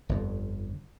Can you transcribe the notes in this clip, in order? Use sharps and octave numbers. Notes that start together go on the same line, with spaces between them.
G1 F2